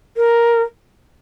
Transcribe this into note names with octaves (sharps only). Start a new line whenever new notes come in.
A#4